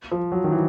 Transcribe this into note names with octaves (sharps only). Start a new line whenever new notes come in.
F3
F#3
D#3
E3